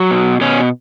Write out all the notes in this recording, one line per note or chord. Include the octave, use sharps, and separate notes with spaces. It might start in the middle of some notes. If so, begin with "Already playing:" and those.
Already playing: F#3
B2
B2 C#4